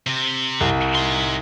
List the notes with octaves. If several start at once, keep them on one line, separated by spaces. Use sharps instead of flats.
C3
C2
D#4 C6